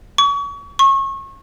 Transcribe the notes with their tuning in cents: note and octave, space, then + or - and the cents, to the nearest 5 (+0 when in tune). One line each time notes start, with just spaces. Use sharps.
C#6 +35
C#6 -30